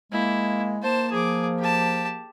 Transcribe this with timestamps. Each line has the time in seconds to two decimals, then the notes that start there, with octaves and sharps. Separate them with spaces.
0.12 G#3 A#3 E4
0.83 A#3 C5 A5
1.11 F3 G#4 D6
1.59 G4 A5